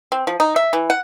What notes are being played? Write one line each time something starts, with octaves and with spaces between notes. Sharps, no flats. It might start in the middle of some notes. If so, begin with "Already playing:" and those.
C4
F3
D#4
E5
E3
F#5